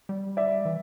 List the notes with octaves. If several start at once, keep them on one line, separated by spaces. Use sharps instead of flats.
G3
D5 E5
E3